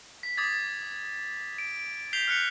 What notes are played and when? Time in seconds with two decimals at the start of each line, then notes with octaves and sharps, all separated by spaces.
0.23 B6
0.38 D6 D#6 G#6 A6
1.58 D7
2.13 G6 B6 C7 F7 G7
2.28 F6 F#6 C#7 F7